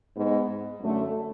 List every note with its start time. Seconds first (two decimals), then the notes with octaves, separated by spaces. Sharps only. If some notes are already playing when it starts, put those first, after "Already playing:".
0.17 G#2 G#3 B3
0.81 F#2 D3 A3